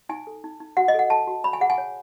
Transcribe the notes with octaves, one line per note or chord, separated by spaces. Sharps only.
D#4 G#5
A4
D#4
D#4
F#4 F#5
D#5
A4 F#5
A4 A5
F#4
C#5 B5
G#5
G#4 F#5
G#5
C#5